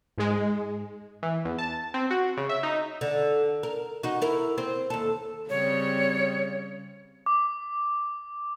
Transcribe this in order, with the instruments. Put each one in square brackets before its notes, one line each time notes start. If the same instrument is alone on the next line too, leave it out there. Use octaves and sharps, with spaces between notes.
[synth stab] G#2 G#3
E3
E2
A5
C4
F#4
C#3
E5
D#4
[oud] D3
A#4
D#4 F#4
E4 A#4
C4
D#2 A4
[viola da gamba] C#3 G3 C4 [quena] C#5
[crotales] D6